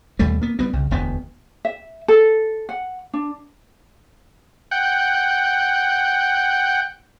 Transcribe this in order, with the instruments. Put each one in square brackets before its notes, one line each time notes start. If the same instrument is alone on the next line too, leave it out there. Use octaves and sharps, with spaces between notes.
[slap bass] D#2 B2 G3 A3
A#3 B3
G3 B3 C4
C2 C#3
E1 D2 B3
[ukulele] E5
A4
F#5
D4
[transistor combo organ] F#5 G5